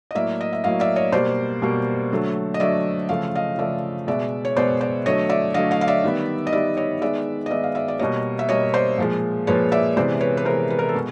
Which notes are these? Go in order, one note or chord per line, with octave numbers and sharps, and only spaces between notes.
D#5
A2 F#3 A#3 D5 E5
D#5
E5
A2 F#3 A#3 D#5 F5
D5 E5
C#5 D#5
B2 G3 A#3 C5 D5
B2 G3 A#3
D3 F#3 A3
D#5
D3 F#3 A3 D5 E5
C#3 F3 A3 F5
D#5 F5
C#3 F3 A3 D5 E5
B2 G#3 B3 D5 E5
C#5
B2 G#3 B3 C5 D5
C5 D5
D3 F#3 A3 C#5 D#5
D5 E5
D3 F#3 A3 D#5 F5
D#5 F5
F5
D5 E5
D#3 G3 B3
D#5
D#3 G3 B3 D5 E5
C#5 D#5
D#3 G#3 B3 D5 E5
D#5
D#3 G#3 B3 D5 E5
F5
D5 E5
D5
B2 G3 A#3 C#5 D#5
E5
B2 G3 A#3 C#5 D#5
C5 D5
A#2 F3 G#3
A#2 F3 G#3 B4 C#5
D5 E5
C3 E3 G#3 B3 C5 D5
B4 C#5
B4
C3 E3 G#3 B3 A#4 C5
B4
A#4
A4
B2 G#3 B3